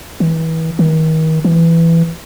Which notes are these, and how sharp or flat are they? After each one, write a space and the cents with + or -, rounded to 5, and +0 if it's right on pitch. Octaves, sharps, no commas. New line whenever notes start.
E3 -30
D#3 +35
E3 +10